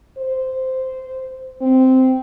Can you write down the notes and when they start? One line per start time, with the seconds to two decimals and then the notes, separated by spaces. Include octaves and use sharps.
0.18 C5
1.61 C4